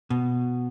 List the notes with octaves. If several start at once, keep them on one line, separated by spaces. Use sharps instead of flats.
B2